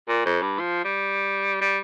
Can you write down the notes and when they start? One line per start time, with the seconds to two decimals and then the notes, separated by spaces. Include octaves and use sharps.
0.09 A#2
0.26 F2
0.42 G2
0.59 F3
0.85 G3
1.61 G3